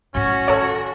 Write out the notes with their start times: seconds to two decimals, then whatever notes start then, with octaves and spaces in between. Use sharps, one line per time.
0.15 A2 A3 C#4 F#4
0.48 D#3 A4 C#5